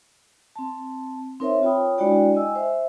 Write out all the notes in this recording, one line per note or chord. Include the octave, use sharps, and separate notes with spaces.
C4 A5
C4 D#4 A#4 C5 C#5 E5
F4 C#5 G5 B5 D#6
G#3 D4 E4 F#4 D5 G5
D#5 G#5 E6
C5 E5